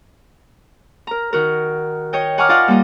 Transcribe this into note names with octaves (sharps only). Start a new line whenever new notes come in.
A#4 A#5
D#3 F#4 A#4
C#5 D#5 G5
F#5 G#5 A#5 C#6 D6 F6
F4 D5 D#5 F5 F#5
G3 A#3 F4 D#5